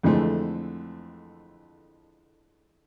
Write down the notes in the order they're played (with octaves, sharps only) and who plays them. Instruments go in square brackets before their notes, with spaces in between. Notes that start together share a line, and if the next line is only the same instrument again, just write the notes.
[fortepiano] F2 D3 E3 G#3 A3 C4